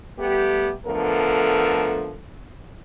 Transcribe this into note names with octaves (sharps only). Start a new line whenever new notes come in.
G3 A3 B3 G4
D3 F3 A3 B3 A4 A#4